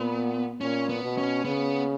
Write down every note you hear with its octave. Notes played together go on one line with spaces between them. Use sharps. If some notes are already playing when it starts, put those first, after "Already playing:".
Already playing: A#2 B3
A#2 C#4
B3
B2
C#4
C#3 B3